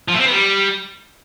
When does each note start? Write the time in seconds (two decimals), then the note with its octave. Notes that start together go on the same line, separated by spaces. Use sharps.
0.08 F3
0.14 A3
0.20 C4
0.26 B3
0.32 G3